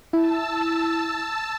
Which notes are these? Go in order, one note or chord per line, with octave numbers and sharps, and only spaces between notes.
E4 A5 E6